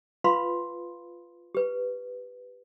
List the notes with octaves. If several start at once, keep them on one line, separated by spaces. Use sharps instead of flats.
F4 B4 F5 B5 C6
G4 B4